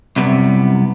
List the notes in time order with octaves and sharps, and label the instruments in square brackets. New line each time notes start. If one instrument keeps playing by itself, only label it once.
[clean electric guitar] C2 F#2 C3 B3